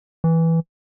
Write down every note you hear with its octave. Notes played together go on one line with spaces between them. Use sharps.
E3